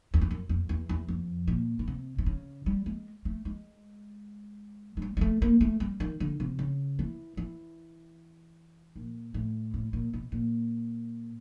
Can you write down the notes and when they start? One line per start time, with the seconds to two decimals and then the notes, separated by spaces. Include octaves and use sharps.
0.14 E2
0.21 F2
0.31 F#2
0.49 F2
0.69 E2
0.89 E2
1.08 F2
1.48 A#2
1.79 B2
1.88 C3
2.18 C3
2.26 C#3
2.66 G3
2.86 G#3
3.25 A3
3.45 G#3
4.97 G#3
5.02 G3
5.17 G#3
5.21 A3
5.42 A#3
5.61 A3
5.80 G3
6.00 D#3
6.20 D3
6.40 C3
6.59 C#3
6.99 E3
7.37 E3
8.96 A#2
9.34 A2
9.74 A2
9.93 A#2
10.14 B2
10.32 A#2